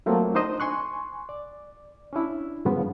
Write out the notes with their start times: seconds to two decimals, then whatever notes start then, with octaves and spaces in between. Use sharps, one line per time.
0.06 F#3 A3 A#3 C4 F4
0.35 D4 D#4 C5 D#5
0.60 G#5 C6 C#6 F#6
1.29 D5
2.13 C#4 D4 E4
2.65 G2 C#3 F3 B3